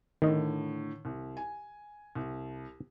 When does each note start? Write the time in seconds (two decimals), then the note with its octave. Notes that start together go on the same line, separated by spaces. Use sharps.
0.22 A2 D3 D#3 D#5
1.05 C2
1.37 G#5
2.15 C2